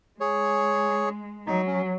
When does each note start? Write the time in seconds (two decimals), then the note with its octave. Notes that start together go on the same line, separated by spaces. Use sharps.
0.20 G#3 G#4 C#5
1.47 F#3 D#4
1.67 C#4